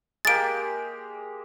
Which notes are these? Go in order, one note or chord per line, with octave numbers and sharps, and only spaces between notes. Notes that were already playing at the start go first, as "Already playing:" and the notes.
G#3 A#3 G4 A6 D7